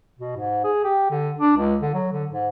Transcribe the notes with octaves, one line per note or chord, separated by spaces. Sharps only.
B2
G#2
G#4
G4
D3
D4
C#2
D3
F#3
D3
G#2